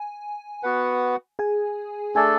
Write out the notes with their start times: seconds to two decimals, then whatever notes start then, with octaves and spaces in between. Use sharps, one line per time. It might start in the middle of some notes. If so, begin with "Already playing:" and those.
Already playing: G#5
0.63 B3 F#4 B4 F#5
1.39 G#4 G#5
2.15 A3 D4 G#4 A4 D5 G#5